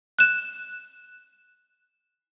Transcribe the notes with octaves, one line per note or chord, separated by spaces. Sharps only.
F#6 E7